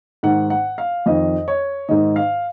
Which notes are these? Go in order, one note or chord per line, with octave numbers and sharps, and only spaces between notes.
G#2 D#3 F#5
F#5
F5
F2 D#3 D#5
C#5
G#2 D#3 D#5
F5